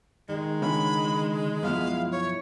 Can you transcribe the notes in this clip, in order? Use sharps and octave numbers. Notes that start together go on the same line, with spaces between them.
D#3 G#3
C#2 D3 C#4 B5
F#2 B2 F3 E4 F5
C#5